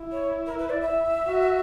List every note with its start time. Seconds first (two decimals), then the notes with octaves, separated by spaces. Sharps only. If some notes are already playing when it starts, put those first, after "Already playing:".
Already playing: E4
0.12 C#5
0.47 A#4
0.58 B4
0.70 D5
0.81 E5
1.27 F#4